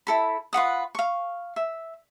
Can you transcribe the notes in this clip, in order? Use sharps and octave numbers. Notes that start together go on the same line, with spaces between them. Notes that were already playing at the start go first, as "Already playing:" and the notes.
E4 A4 B5
F4 B4 F#5 D#6
F5 C#6
E5